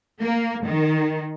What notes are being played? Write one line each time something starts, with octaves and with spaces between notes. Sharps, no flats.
A#3
D#3